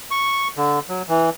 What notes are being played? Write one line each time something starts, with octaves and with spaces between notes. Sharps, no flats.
C#6
D3
F#3
E3